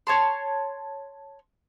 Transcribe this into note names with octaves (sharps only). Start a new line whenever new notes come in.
C#5 A5 C6